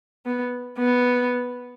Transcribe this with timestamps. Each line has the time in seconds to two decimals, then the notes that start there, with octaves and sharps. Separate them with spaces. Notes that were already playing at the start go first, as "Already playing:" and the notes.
0.26 B3
0.79 B3